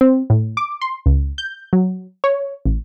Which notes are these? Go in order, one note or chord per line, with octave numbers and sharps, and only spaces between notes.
C4
A2
D6
C6
C#2
G6
F#3
C#5
A1